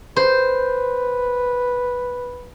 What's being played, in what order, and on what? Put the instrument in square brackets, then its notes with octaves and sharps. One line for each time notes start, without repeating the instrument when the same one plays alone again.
[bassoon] B4 [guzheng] C5